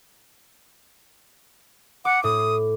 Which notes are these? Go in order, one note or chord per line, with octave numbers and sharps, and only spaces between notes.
F#5 D6
A2 D#6